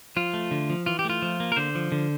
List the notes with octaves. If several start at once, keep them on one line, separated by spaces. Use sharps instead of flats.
F3 F4
A3
D3
F3
E3 F4
G4
A3 F4
F3
A#3
A#4
D3 C5
F3
D3